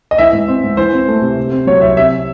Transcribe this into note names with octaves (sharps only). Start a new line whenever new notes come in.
D#5
E3 E5
G#2
C4
G#2
E3 C5
C4
A3
C3
C3
C4
F#3 C#5
C2 E5
C3 E5